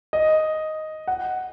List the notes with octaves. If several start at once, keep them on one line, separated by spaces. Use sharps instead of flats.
D#5
F#5